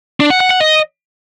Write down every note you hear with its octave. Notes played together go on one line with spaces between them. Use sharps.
D4
F#5
F#5
F#5
D#5